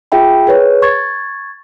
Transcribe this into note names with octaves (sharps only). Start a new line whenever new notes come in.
F4 G#4 E5 G5 B5
G#4 B4 C#5
C#6 G#6 A6